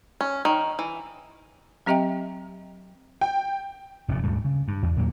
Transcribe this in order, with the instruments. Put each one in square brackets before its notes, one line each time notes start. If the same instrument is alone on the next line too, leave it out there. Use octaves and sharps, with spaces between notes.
[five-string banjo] C#4
D#3
E3
[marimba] F#3 C4 G4 D#5 E5 G5
[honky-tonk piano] G5
[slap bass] F1 F#2 A#2
D1 D2 G#2 G3
C#3
G2
E2
E2 A#2 F#3 A#3